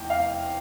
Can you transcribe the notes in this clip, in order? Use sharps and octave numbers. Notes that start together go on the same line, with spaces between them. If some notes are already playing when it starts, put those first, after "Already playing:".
Already playing: F1 E2 E3 G5
F5